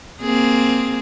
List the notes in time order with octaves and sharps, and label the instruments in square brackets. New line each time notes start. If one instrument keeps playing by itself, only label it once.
[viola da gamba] A#3 C4 G#4